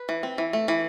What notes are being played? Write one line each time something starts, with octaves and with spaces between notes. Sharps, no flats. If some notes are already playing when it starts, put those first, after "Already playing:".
Already playing: B4
E3
C4
E3
A3
E3